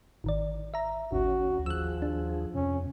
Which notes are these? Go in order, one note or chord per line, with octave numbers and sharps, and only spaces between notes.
G#1 D#3 D5
E5 A#5
G#1 D2 C#4 F#4
D#2 F3 G#4 E6 F#6
D4
F2 C3 C#4